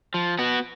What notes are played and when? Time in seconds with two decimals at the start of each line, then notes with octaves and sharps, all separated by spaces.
0.14 F3
0.39 B3 F#4